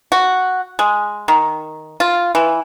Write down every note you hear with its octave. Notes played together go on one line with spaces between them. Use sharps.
F#4
G#3
D#3
F4
E3